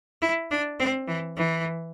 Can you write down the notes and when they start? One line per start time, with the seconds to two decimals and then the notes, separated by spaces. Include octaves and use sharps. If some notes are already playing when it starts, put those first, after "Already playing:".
0.22 E4
0.51 D4
0.80 C4
1.08 E3
1.37 E3